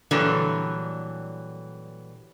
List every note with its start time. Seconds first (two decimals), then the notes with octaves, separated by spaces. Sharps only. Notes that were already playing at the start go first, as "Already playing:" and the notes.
0.11 A#2 D3 E3 F#3 G3